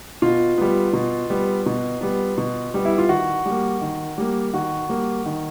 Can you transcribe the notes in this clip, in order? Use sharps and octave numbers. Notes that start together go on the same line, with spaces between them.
B2 F4
G3 B3
B2
G3 B3
B2
G3 B3
B2
G3 B3
E4
F4
D#3 F#4
G3 A#3
D#3
G3 A#3
D#3 F#4
G3 A#3
D#3